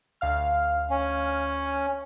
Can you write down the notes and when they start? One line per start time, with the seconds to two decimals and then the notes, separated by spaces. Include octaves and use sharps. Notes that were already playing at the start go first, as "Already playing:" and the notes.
0.21 D2 F5 F6
0.90 C#4